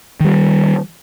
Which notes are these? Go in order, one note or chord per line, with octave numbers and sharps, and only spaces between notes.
D#3 G3